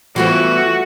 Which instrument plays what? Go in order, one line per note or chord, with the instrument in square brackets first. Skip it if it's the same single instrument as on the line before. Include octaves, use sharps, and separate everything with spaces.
[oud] E3 G3 B3 [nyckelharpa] A3 [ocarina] F4 [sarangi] F#4